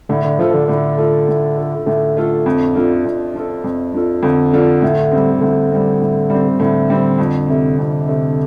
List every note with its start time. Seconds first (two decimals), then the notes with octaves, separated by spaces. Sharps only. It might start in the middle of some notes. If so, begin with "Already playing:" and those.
0.09 A2 D3
0.25 D3
0.39 F3 A3 F4 A4
0.54 D3
0.68 A2 D3
0.97 A3 F4 A4
1.28 A2
1.57 A3 F4 A4
1.86 A2 D3
2.17 A3 F4 A4
2.46 F2
2.75 F3 D4 F4 A4
3.05 F2
3.34 F3 D4 F4 A4
3.64 F2
3.94 F3 D4 F4 A4
4.23 F2 D3
4.53 F3 D4 F4 A4
4.82 A2
5.12 G3 C4
5.41 A2 D3
5.71 G3 C4
6.01 A2
6.30 G3 C4
6.60 A2 D3
6.90 G3 C4
7.18 F2
7.49 C3 A3
7.79 F2
8.08 C3 A3